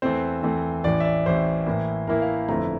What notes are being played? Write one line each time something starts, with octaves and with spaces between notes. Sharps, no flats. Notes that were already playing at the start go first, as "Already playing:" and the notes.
E2 E3 A3 C4 C5
E2 E3 A3 C4
A1 A2 E3 D5
E5
D5
A1 A2 E3 C5
A2 E3 A#3 E4
A2 E3 A#3 E4 A#4
F5
G1 F2 D3 A3 E4 A#5